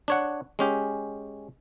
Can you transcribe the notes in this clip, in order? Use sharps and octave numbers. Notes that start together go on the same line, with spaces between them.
D4 C#5 F#5
G#3 C#4 G4